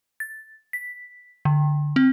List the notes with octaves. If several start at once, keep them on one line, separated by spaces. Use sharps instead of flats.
A6
B6
D3
C4